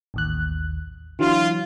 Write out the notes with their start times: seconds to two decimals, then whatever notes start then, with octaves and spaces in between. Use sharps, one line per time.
0.14 A1 D#2 F#6
1.19 D3 E3 F#3 F4